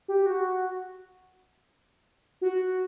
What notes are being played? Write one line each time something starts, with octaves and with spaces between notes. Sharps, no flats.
G4
F#4
F#4